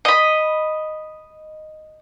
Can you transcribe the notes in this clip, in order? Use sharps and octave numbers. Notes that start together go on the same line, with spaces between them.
D#5 B5